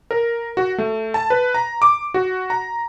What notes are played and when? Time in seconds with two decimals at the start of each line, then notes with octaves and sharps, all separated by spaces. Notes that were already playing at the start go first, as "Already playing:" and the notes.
0.11 A#4
0.57 F#4
0.78 A3
1.14 A5
1.30 B4
1.54 A#5
1.82 D6
2.14 F#4
2.50 A#5